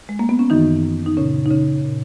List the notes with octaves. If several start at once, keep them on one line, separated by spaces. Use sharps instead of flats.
G#3
A#3
B3
C#4
F#2 D#3 E3 D#4
D#4
A#2 C#3 C#4
D#4
C#3 C#4
A#2